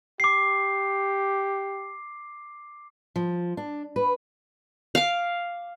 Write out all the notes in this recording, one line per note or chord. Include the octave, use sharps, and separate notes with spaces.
G4 D6 C7
F3
D4
B4
F5 D6